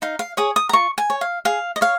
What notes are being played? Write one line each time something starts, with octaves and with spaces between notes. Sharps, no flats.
D#4 F5
F5
G#4 C#5 D#6
D#6
A#5
F4 C#6
G#5
C#5
F5
G#4 F5
D#5
C#5 F5